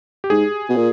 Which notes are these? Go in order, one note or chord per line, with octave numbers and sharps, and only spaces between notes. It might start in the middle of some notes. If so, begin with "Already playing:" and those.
G4
G#2 G#4
B2
A#2